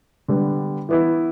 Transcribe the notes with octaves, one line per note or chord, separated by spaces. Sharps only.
D3 G3 B3
E3 B3 E4